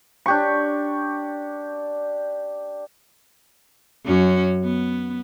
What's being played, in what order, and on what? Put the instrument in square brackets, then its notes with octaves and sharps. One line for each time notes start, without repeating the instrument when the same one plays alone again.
[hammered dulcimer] D4 G4 C#6
[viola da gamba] F#2 C#4 F#4
B3